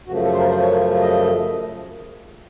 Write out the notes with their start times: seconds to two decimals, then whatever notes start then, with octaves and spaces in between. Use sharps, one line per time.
0.07 F#2 C#3 F3 A3 F#4
0.23 A4
0.33 C5
0.39 A#4
0.49 C5
0.60 C#5
1.01 D#5